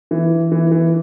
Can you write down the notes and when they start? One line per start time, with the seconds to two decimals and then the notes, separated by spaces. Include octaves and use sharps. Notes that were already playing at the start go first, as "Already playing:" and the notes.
0.11 E3
0.52 E3
0.72 E3